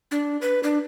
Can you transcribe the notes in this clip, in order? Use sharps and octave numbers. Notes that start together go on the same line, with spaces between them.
D4
B4
D4